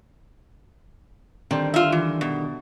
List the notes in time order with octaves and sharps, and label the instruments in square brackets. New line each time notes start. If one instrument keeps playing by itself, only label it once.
[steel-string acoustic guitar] D3 D#3 G3 [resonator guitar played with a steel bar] C4
[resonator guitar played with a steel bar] F4 E5
E3
B2